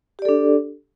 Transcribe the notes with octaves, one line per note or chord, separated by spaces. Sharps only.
D4 G4 A4 D5